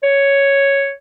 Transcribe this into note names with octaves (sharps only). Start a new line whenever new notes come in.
C#5